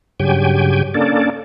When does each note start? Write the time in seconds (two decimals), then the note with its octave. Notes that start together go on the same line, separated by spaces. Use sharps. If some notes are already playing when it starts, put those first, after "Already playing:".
0.20 G2 C#3 F#3 G4 G5 G#5
0.94 A#3 C#4 D4 A4 D5